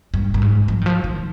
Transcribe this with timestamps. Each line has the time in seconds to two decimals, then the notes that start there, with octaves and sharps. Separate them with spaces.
0.14 G2
0.34 G2
0.42 G#2
0.68 F3
0.81 D#3
0.86 F3
1.04 D#3